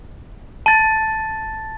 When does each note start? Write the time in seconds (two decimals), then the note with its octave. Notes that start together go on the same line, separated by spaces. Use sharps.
0.66 A5 A6